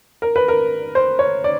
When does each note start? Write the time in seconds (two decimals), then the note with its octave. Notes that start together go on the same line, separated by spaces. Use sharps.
0.22 A#4
0.36 B4
0.48 A#4
0.95 C5
1.19 C#5
1.44 D5